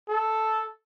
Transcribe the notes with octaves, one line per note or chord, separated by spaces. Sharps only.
A4